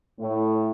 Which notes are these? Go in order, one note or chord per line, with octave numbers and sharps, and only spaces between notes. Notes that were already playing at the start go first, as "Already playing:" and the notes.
A2